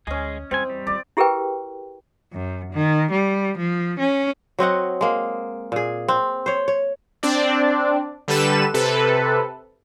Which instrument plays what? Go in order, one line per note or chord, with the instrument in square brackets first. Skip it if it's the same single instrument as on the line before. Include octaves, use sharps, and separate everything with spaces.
[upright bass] D2 [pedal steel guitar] G#3 G#4 [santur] C#4 D#5
[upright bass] E2 [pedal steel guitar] G3 G#5 [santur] C4
[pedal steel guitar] G3
[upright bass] D#3 F4 [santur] D5
[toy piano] E4 G4 G#4 A#4 B4 G5
[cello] F#2
D#3
G3
F3
C#4
[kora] F#3 C4 D#5 F#5
G#3 A#3
A#2 G#4
C4
C5 C#5
C#5
[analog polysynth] C4 D4 D5
D3 G3 A4 B4 E7
C3 A4 B4